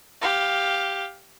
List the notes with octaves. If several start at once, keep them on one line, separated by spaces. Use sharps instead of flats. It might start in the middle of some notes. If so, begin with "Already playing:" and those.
G4 F5